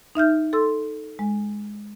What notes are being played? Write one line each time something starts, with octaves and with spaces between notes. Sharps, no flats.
D#4 E5 F6 G6
A4 C6 E6
G#3